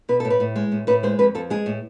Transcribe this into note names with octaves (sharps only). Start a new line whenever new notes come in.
B2 B4
A2 A4
B4
A2
G#3
A2
A2 B4
G#3 C5
F2 B4
F2 A4
G#3 G#4
A2